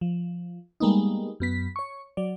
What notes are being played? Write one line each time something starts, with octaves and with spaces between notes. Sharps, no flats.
F3
G3 G#3 A#3 B3 D#4
F#2 B3 B6
C#5 C#6
F#3 D5